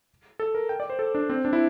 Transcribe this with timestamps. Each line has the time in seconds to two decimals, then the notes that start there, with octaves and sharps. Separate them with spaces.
0.39 A4
0.55 A#4
0.69 G5
0.80 D5
0.90 C5
0.99 A4
1.15 D4
1.30 C4
1.45 D4
1.53 E4